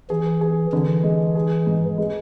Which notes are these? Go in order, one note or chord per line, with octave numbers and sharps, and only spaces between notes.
E3 G#4
G#4
D3 E3
G#3
G#4
G#2
G#3